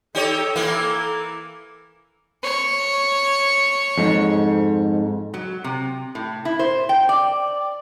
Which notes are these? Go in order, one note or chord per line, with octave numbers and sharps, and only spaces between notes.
D#4 G4 A4 C#5
E3 A#3 E4
C#5
F2 G#2
F#3
C3
A2
E4
C5
G5
D5